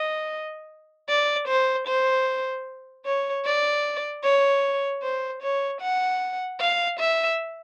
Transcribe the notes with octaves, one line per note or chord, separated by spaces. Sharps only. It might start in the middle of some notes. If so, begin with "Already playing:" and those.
Already playing: D#5
D5
C5
C5
C#5
D5
C#5
C5
C#5
F#5
F5
E5